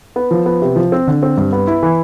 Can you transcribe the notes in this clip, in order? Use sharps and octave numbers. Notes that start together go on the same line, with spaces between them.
B3
F3
B3
C3
F3
C4
D3
C4
G2
B3
E4
E3